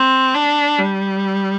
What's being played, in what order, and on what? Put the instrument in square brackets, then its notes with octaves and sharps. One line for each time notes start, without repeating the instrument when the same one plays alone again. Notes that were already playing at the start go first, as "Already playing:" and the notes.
Already playing: [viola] C4
D4
G3